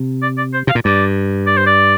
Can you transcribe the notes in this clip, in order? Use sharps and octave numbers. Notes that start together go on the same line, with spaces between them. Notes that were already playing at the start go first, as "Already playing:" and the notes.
Already playing: C3
D5
D5
C5
C3 F5
A#2
G2 D5
D5
C5
D5